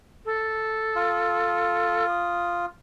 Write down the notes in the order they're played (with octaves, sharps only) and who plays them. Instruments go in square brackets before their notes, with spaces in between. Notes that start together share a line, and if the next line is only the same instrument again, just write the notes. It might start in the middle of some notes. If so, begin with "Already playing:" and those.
[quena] A4
[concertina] F4
[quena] D#6